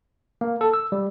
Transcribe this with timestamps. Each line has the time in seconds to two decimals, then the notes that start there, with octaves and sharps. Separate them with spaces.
0.41 A#3
0.61 A4
0.74 E6
0.92 G3